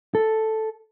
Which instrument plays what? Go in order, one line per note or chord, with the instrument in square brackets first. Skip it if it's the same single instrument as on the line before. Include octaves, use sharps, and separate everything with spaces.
[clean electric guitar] A4